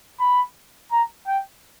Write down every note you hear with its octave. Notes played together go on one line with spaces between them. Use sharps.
B5
A#5
G5